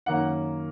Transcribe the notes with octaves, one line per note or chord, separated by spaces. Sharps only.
F#2 D#3 A#3 C#4 F#5